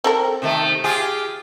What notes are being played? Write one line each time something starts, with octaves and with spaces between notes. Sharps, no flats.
C4 A4 A#4
C3 D#3 A3
F4 G4 G#4